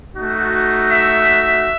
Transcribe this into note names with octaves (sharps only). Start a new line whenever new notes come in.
A3 D#4 F#4
E5